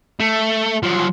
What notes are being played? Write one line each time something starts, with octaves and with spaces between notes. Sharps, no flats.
A3
F3 F#3